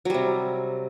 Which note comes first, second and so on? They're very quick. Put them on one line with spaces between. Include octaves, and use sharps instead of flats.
F#3 G3 C3